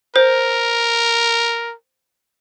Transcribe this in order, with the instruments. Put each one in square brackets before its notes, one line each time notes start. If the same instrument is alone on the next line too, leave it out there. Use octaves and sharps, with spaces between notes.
[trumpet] A#4 [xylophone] C5